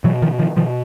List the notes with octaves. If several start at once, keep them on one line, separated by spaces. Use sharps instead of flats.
B2 E3 F#3
D#3 F3
D#3 F3
B2 D#3 F3